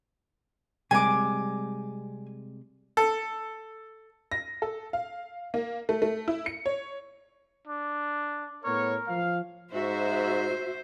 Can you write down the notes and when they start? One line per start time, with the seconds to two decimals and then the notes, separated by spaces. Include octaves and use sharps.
0.91 C3 G3 G#3 G#5 D6
2.97 A4
4.32 A#6
4.62 A4
4.93 F5
5.54 A#3
5.89 A3
6.02 A3
6.28 E4
6.46 C#7
6.66 C#5
7.67 D4
8.64 A2 B3 A#4 C#5
9.07 F3 F5
9.74 G#2 F#4 C5 E5